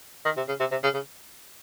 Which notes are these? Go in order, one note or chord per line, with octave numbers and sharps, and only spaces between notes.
D#3
C3
C#3
C3
C3
C#3
C#3